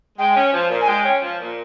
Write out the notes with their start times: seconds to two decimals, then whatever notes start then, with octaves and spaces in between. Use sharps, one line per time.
0.18 G#3 G5
0.36 C#4
0.53 F3
0.70 A#2
0.81 G#5
0.88 G#3 G5
1.05 C#4
1.22 F3
1.39 A#2